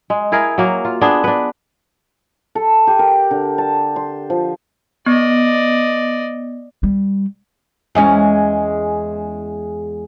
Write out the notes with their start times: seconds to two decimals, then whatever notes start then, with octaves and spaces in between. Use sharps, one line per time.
0.10 G#3
0.32 E4 G#4 A#4 F5
0.58 F#3 A#3
0.85 F4
1.01 B3 D4 G#4
1.24 D4 B4
2.55 A4
2.87 G4
2.99 A#4
3.31 D3
3.58 A5
3.96 C6
4.30 F3
5.06 B3 D5 D#5
6.83 G3
7.95 E2 G#3 C#4